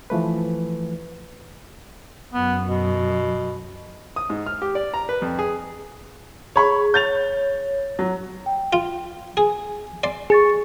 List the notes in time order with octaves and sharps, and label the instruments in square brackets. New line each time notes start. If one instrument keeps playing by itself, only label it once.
[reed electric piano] E3 F3 A3 B4
[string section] F#2 [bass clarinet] B3
[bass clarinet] B2
[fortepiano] D#6
G#2
F6
G4
D5
A#5
B4
F2
G#4
[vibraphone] G#4 [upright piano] C#5 B5 C#6
[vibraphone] C#5 [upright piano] G6 A6 F7
[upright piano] F#3
[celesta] G5
[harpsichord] F4
[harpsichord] G#4 [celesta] G#5
[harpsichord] D5 C6
[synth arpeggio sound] G#4 [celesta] C#6 A6 C#7